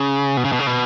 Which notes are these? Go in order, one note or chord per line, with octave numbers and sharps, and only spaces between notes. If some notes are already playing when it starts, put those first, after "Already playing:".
Already playing: C#3
B2
C#3
B2
C#3
B2